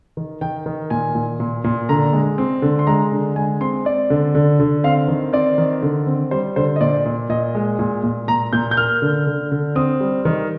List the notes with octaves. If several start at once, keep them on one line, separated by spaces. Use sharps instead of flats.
D#3
D#3 G5
D#3
A#2 G#5
A#2
A#2
A#2
D3 A#5
G#3
C4
D3
C6
G#3 A#5
D3
G#3 G#5
C4 C6
C4 D5
D3
D3
D3
C4 F5
D#3
C4 D5
D#3
D3
C4
G3 C5
D3 C5
D#5
A#2 D5
A#2
A#2 D#5
G#3
A#2
A#2
A#2 A#5
A#2 G6
G6
A#3 F6
D3
D3
D3
C4 D#6
G3
D#3